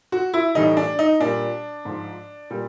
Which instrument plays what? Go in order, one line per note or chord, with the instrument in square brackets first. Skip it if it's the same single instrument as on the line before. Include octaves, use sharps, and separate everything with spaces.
[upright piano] F#4
E4
A2 E3 G3 D#4
D4
D#4
A#2 G3 D4
G#2 F3
A#2 G3